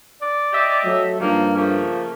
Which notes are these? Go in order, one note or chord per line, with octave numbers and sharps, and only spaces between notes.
D5
G4 D#5 E5
F#3 A3
G2 D#3 F3 A#3
C#3 F3 A3 A#3